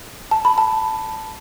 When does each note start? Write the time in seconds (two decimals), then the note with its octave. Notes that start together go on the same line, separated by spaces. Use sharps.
0.31 A5
0.45 B5
0.58 A5